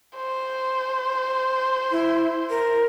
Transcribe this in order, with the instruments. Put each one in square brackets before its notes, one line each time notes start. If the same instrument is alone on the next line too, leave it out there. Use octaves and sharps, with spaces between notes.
[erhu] C5
[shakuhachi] E4
A#4